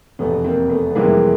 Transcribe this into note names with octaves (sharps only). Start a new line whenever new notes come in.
F1 E2 B2 A3 B3
A#3 C4
A3 B3
B3
F2 C3 E3 G3 G#3 A#3